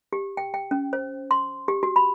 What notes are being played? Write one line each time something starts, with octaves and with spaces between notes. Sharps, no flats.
G4
G5
G5
C#4
C5
C6
G4
F#4
B5